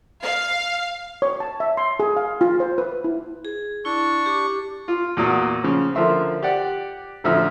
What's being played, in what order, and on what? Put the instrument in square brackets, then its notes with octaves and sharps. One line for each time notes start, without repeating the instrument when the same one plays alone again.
[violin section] F5
[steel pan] C#5
A5
E5
C6
G#4
F5
F4
C5
B4
E4
[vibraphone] G#4
[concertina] D4 C#6 [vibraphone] E4
[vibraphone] G4 D6
[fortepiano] F4
E2 A#2 F#4 D#6
C#3 F3
D3 F3 A#4 E5 C6
G4 D5 F#5
A1 D2 F3 E5 F6